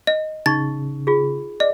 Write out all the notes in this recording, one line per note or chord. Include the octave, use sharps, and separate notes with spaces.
D#5
A1 C#3 D#4 C#6 A6
F4 G#4
D5 D#5